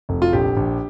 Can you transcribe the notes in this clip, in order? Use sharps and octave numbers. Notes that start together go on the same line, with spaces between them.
F1
F4
A#1 G4
A#1